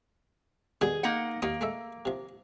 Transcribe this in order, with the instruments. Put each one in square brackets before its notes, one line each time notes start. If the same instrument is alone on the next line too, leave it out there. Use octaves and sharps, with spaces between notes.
[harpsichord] G2 B2 D#3 [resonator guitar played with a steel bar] G#4
[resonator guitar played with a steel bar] A#3 D#4 F#5
[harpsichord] D#2 C#6 D#6 [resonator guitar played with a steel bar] A#3
[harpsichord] G#3 A3 E5
C3 F3